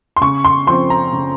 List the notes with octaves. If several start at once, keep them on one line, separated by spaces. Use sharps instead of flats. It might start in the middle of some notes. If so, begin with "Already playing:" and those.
C6
C#3 C#6
C6
F3 C4 C6
A#5
C#3